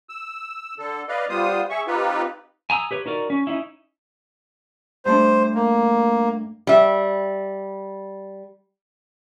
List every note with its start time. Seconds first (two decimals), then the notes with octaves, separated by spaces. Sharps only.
0.09 E6
0.79 D3 A4
1.09 B4 D5 D#5 F5
1.29 G3 B3 F4 C5 D#6
1.70 G#4 E5 C#6
1.87 C4 D#4 F4 G4 B4
2.70 G#5 A#5 D#6 E6
2.91 G4 B4 C#5
3.06 D#4 F#4 A#4 D5
3.30 C#4
3.47 C#4 D#4 E4
5.05 G2 A3 D4 C5
5.55 A#3
6.67 G3 E5